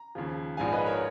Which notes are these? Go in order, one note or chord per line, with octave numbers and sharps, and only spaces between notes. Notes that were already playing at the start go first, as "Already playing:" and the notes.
Already playing: A#5
D#2 C#3 F3
A#1 G#2 F3 F5 G#5
B4 D#5
A#4 C#5